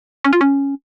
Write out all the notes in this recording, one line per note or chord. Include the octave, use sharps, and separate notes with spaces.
C#4
F4
C#4